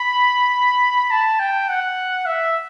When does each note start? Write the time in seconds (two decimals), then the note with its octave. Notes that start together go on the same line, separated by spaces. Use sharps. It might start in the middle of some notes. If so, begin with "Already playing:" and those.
Already playing: B5
1.11 A5
1.40 G5
1.69 F#5
2.26 E5